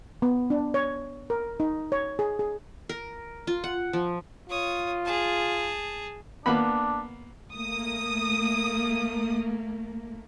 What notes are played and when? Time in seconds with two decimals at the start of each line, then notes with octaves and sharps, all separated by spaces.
0.22 B3
0.50 D4
0.74 C#5
1.30 A#4
1.60 D#4
1.92 C#5
2.19 G#4
2.39 G#4
2.89 A#4
3.47 F4
3.64 F#5
3.93 F3
4.50 F4 C#5 D#6
5.05 G#4 A5
6.46 A#3 B3 D4 B5
7.54 A3 A#3 D#6